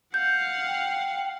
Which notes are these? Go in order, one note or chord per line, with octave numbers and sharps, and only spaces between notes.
F5 F#5 G6
G5